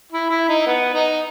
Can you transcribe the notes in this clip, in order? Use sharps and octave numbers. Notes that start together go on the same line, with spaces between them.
E4
E4
D#4
B3
D#4